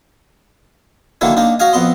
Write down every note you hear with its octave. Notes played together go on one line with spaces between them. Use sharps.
D3 D#3 F#3 A#3 D4 E4
A#3 D4 D#4
F#4 D#5 F5 G#5
F2 B3 D#5 C6